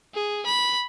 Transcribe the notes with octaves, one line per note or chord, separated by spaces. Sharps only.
G#4
B5